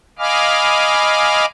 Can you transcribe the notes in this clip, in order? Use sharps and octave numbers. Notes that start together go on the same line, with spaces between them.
D#5 F5 G#5 B5 D6 F6